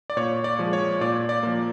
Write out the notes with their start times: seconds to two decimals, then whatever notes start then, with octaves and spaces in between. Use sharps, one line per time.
0.10 D5
0.17 A#2 C#5
0.44 D5
0.59 F3 G#3
0.73 C#5
1.01 A#2 D5
1.29 D5
1.43 F3 A#3